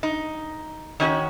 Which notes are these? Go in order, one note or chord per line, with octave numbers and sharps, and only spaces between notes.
D#4
D#3 C#4 F#4 C#5